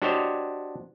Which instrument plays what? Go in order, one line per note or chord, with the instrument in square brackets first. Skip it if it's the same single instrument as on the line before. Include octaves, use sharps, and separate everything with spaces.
[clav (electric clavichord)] D4 F#4 G4 C5 C#5 D#5